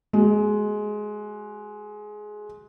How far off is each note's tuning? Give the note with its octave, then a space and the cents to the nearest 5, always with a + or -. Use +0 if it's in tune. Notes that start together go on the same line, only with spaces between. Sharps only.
G#3 +15 F#4 +45